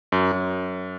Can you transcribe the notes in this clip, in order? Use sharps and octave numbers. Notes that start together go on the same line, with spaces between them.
F#2
F#2